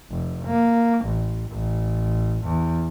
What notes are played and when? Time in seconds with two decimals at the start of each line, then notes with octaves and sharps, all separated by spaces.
0.11 F1
0.46 A#3
1.06 A1
1.51 A1
2.45 E2